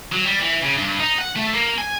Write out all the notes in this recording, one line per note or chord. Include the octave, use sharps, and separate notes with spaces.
F#3
G3
E3
C#3
G2
D#4
F#5
A3
A#3
G#5